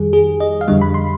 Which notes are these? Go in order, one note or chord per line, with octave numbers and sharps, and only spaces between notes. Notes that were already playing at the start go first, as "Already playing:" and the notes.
Already playing: F2 D#3 G3 G#4
G#4
D#5
F5
F2 D3 G3 D#5
B5
C6